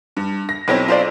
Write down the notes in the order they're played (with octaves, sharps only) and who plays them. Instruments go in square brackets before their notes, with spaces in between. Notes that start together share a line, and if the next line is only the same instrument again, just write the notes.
[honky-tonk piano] G2
A#6
[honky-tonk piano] B1 C4 A#6 [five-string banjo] E4 G4 C#5
[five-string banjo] F4 C5 D5